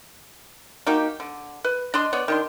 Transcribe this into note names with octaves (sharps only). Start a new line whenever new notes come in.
A#3 D#4 F#4 G4
D3
B4
D4 D#5 C6
B3 C#5 D5
D#3 D4 C6